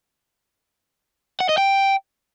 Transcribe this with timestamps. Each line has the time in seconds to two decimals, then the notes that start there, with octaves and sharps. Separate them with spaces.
1.40 F#5
1.49 D#5
1.58 G5